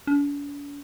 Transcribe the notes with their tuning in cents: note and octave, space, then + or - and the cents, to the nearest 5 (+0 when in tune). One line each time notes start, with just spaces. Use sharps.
D4 -45